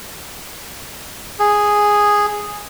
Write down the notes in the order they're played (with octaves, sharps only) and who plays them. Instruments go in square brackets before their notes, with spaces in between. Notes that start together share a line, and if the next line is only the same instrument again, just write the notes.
[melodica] G#4